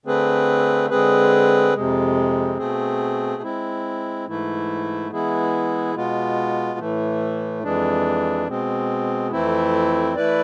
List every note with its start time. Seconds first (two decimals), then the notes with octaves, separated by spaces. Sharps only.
0.06 D3 A3 C4 G#4 B4
0.90 D3 G#3 C4 G#4 B4
1.74 F2 C3 G#3
2.58 B2 A3 C4 G#4
3.42 G#3 C4 E4
4.27 G#2 E3 A3 E4
5.11 E3 G#3 B3 E4 G#4
5.95 B2 G#3 B3 F4
6.79 A2 E3 A3
7.63 F2 E3 G#3 D4
8.48 B2 G#3 C4
9.32 F2 E3 A3 C4 E4
10.16 E3 A3 E4 B4 D5